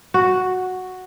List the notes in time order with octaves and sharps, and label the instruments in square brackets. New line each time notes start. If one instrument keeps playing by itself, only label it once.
[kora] F#4